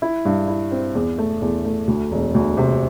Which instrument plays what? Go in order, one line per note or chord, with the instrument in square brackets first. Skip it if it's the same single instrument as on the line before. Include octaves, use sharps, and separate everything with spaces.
[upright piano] E4
G2
E4
C4
E2
A3
E2
A3
D2
E1
D2
C3